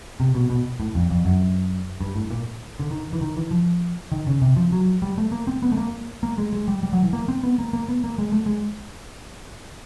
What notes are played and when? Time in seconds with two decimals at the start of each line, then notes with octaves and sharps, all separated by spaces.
0.20 C3
0.35 B2
0.50 B2
0.80 A2
0.95 F2
1.10 F2
1.25 F#2
2.01 G2
2.16 A2
2.31 A#2
2.80 D3
2.91 D#3
3.13 E3
3.21 D#3
3.36 E3
3.51 F3
4.12 D#3
4.27 C#3
4.42 C3
4.56 F3
4.72 F#3
5.02 G3
5.18 A3
5.32 A#3
5.47 C4
5.62 B3
5.72 A3
5.77 A#3
6.23 A#3
6.38 G#3
6.53 G#3
6.68 G3
6.83 G3
6.93 F#3
7.03 E3
7.13 A#3
7.28 C4
7.43 B3
7.59 A#3
7.73 A#3
7.89 B3
8.04 A#3
8.18 G#3
8.32 A3
8.46 G#3